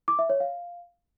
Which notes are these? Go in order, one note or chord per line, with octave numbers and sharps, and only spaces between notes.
D6
E5
C#5
F5